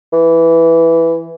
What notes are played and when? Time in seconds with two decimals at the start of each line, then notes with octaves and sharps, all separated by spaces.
0.13 E3